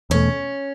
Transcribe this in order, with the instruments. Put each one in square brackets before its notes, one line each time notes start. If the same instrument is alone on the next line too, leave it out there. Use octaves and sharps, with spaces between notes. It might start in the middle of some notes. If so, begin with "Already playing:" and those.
[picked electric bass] E2 B2 A3 [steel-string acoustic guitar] C#4